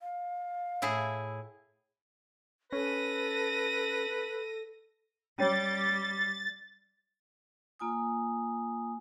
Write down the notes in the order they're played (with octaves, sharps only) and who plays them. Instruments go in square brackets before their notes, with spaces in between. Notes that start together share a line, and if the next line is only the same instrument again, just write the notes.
[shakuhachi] F5
[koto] A2 E4 G#4
[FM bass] C#4 [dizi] A4 [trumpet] B4 [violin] A#6 D#7
[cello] G3 [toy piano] C#4 C#5 [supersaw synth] A6
[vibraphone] A#3 F4 G#5 D#6